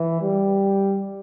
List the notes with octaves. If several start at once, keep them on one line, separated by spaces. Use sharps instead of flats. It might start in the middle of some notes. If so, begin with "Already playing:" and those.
Already playing: E3
G3